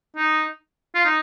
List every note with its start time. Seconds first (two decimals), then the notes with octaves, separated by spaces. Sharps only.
0.16 D#4
0.95 F4
1.05 D#4